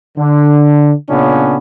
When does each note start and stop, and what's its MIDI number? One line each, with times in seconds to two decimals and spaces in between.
0.18 0.94 50
1.10 1.57 46
1.10 1.57 49
1.10 1.57 59
1.10 1.57 61
1.10 1.57 62